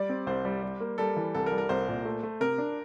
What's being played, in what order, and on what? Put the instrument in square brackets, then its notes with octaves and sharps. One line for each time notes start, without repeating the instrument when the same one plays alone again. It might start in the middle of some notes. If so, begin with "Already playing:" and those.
Already playing: [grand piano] G3 [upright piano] D5
[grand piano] C4
[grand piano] C2 [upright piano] C5
[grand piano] G3
G3
A#3
[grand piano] G3 [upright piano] A4
[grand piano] E3
[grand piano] C2 [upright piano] A4
[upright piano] A#4
[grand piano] G3
[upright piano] A#4
[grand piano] C2 [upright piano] C5
[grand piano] A#2
A3
A3
[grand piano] C3 [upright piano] A#4
[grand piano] D4